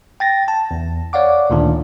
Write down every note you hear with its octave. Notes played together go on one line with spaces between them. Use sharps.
G5 A6 A#6
A5
E2
C#5 D5 F5 F#5 D6
D2 A#2 D#3 D4